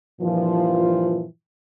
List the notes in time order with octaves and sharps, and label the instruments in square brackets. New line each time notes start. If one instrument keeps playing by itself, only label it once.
[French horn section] G2 A#2 E3 F3